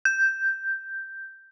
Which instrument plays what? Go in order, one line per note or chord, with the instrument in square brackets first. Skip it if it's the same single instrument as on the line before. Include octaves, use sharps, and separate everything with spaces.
[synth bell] G6